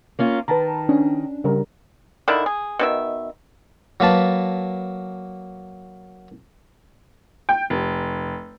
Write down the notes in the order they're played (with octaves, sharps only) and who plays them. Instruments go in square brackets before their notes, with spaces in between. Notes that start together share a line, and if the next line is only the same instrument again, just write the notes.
[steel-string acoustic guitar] A#3 C#4 F4
[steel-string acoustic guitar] D#3 [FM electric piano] B4 A5 A#5
[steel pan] C#4 [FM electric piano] D4
[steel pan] C#3 G3 A#4
[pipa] D3 D#3 D4 E4
G#4
B2 D#3 E5
[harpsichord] F#3 A#3 B4 A5
[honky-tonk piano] G5
F1